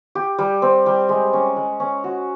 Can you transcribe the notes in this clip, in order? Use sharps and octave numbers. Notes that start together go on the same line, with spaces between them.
G4
G3
C4
G3
G#3
C#4
G#3
C#4
F#4